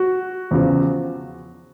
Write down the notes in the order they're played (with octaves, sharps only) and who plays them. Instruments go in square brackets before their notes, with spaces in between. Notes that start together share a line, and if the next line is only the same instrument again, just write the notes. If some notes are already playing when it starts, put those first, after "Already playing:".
Already playing: [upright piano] F#4
E2 C#3 F3